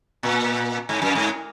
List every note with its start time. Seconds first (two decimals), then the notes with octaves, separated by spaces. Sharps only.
0.23 A#2
0.89 G#2
1.02 F#2
1.15 G#2